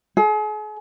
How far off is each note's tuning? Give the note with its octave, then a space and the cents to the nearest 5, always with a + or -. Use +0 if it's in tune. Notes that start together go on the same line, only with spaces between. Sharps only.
G#4 +40